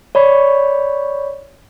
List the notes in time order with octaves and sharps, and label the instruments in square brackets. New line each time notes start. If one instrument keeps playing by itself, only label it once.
[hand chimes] C#5 D5 B5 C#6